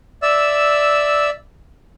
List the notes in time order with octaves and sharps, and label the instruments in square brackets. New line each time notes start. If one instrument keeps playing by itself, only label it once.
[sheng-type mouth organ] D5 E5 E6